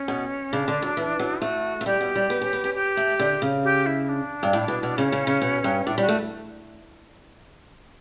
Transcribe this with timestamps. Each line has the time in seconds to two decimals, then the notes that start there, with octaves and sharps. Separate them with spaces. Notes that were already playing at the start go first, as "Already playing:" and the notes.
Already playing: C#4
0.08 B2
0.53 C#3 D4
0.68 D3
0.82 F#3
0.97 E3
1.19 F#3
1.41 A3 F#4
1.81 A3
1.86 G3 G4
2.01 B2
2.15 G3
2.30 B3
2.41 C#4
2.53 B3
2.64 C#4
2.74 G4
2.97 A3
3.20 D3
3.42 C#3
3.64 G4
3.86 E4
4.09 D4
4.43 G2
4.53 A2
4.68 B2
4.83 B2
4.97 C#3 C#4
5.12 C#3
5.27 C#3
5.42 B2
5.64 G2
5.86 A2 D4
5.98 G3
6.01 F#4
6.09 A3